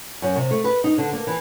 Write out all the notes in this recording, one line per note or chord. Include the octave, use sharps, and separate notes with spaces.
F#2
C3
A3
B4
D#4
D3
A#3
E3